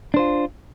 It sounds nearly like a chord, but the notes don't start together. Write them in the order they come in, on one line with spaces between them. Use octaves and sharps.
D4 C5 F4